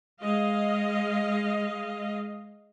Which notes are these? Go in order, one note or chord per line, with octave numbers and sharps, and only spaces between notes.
G#3 D#5 F5